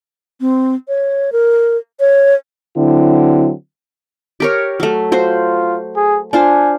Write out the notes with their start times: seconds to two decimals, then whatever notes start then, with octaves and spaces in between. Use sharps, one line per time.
0.41 C4
0.88 C#5
1.32 A#4
2.00 C#5
2.77 D3 F#3 C4 E4
4.40 G4 A#4 C#5
4.80 F#3 A3
5.12 F4 F#4 C5
5.96 G#4
6.33 D4 F4 C5 G#5